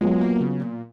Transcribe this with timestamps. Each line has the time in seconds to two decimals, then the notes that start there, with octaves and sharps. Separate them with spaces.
0.01 F#3 G#3 B3 F4
0.21 A#3
0.41 C#3
0.61 A#2